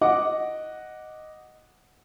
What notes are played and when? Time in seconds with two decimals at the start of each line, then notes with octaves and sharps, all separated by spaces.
0.01 D#5 F#5 D6